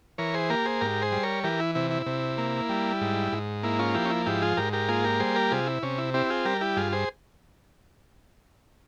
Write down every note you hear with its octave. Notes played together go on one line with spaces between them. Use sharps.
E3 A#4 C#5
G#4 C5
A#3 G4 A#4
G#4 C5
G#2 G4 A#4
G#4 C5
G3
A#4 C#5
E3 G4 A#4
E4
C3 E4
E4
C3
A#3
G3
G#2
G#2
A#3 E4
C#4 F4
F3 E4 G4
C#4
E4
G#2 E4 G4
F4 G#4
G#2 G4 A#4
G4 A#4
A#3 F4 G#4
G4 A#4
G3 G#4 C5
G4 A#4
C3 F4 G#4
E4
C3 C#4
E4
C4 E4 G4
F4 G#4
G3 G4 A#4
E4 G4
G2 F4 G#4
G#4 C5